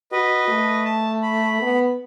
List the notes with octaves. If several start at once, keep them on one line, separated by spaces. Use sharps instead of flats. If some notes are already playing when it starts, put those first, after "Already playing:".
F#4 B4 D#5
A3
A5
B5
B3